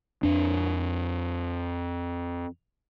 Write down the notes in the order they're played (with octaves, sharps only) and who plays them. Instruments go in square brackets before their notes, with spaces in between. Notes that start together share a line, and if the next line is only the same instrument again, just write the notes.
[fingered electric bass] F2 D4